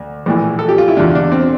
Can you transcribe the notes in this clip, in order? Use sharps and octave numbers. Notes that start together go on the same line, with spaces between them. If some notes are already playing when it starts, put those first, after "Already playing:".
Already playing: D2
A#1 A2 E3
A4
G4
F4
E4
E2 D3 D4
D4
C4